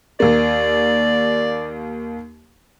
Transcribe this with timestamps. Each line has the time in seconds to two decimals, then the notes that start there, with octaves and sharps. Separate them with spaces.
0.20 D#2 A#3 D5